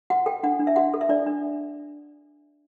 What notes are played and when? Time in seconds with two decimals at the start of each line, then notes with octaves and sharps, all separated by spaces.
0.10 F#4 F#5
0.26 A4 G5
0.43 D4 F#5
0.59 D4
0.67 E5
0.76 F#4 F#5
0.94 A4
1.01 E5
1.09 D4 D5
1.27 D4